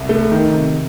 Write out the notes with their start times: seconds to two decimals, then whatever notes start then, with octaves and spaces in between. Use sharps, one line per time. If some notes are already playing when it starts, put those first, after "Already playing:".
Already playing: C2
0.09 A3
0.32 D#3
0.54 C3